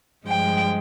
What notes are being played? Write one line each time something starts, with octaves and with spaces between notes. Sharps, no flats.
G2 F3 G#3 G5